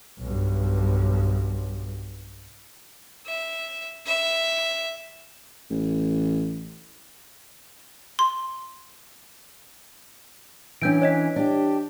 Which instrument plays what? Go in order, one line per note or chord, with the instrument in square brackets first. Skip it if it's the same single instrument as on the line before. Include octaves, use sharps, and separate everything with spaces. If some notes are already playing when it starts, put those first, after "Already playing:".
[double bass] B1 G2
[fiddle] E5
E5
[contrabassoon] A1
[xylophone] C6
[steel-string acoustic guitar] E3 C#4 [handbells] D4 G6 D7
[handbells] C#5 D#5 B6
[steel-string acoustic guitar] D4 G4